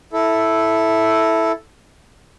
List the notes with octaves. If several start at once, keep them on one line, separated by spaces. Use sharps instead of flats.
E4 A4